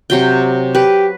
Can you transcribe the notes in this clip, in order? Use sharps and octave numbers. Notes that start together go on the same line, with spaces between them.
C3 F#3 G5
G4 B4